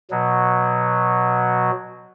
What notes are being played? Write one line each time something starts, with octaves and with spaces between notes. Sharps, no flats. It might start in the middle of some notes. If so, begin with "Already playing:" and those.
B2 F#3